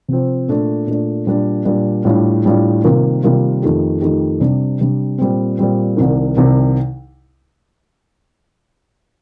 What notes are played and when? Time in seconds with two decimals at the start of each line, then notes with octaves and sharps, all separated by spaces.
0.08 C3 F3 C4
0.48 A#2 A3 D4
0.87 A#2 A3 D4
1.27 A#2 G3 D4
1.65 A#2 G3 D4
2.05 A2 G3 D4 F4
2.45 A2 G3 D4 F4
2.84 C3 D#3 G3 A#3 F4
3.23 C3 D#3 G3 A#3 F4
3.62 F2 D#3 A3 D#4 G4
4.01 F2 D#3 A3 D#4 G4
4.40 C3 G3 D4
4.80 C3 G3 D4
5.18 A#2 G3 C4
5.58 A#2 G3 C4
5.97 C2 C3 D#3
6.37 C2 C3 D#3